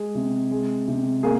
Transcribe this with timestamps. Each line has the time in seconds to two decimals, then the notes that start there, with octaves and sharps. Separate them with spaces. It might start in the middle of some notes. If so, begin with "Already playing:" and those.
Already playing: G#3 G#4
0.15 C3
0.51 G#3
0.88 C3
1.23 A#3 G#4